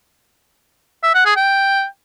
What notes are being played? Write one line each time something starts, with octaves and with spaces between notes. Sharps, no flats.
E5
F#5
G#4
G5